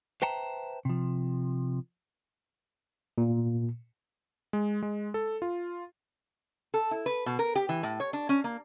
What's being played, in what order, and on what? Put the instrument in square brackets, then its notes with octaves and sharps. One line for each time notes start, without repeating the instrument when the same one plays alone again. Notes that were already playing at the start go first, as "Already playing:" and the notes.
[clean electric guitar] B4 C5 E5 G5 A5 A#5
C3 F3
[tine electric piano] A#2
[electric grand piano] G#3
G#3
A4
F4
[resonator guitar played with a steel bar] A4
E4
B4
B2
A#4
G4
E3
A2
C#5
D4
C#4
A#3